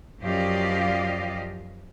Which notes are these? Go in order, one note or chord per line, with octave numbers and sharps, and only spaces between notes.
F#2 F3 G4 D5 D#5 F5